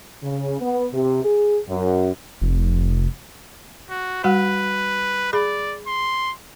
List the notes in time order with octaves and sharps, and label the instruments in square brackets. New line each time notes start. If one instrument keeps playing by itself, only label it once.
[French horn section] C#3
B3
C3
G#4
F#2
[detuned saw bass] F1
[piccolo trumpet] F#4
[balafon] G3 F#4 F#5 [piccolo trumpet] B4
[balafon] G#4 B5 [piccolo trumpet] D5
[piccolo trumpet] C6